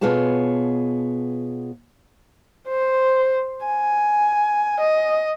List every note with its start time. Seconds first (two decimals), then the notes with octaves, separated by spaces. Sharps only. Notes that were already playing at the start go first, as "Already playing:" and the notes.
0.01 B2 B3 F4 G#4 C#5 A5
2.68 C5
3.65 G#5
4.80 D#5